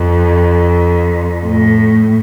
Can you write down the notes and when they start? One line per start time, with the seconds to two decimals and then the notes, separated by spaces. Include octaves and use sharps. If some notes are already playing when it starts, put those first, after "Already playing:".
Already playing: F2
1.45 A2